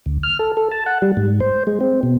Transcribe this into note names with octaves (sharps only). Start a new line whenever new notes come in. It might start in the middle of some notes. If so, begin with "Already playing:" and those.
D2
F6
A4
A4
A5
F#5
G3
G#2
C5
G#3
C4
B2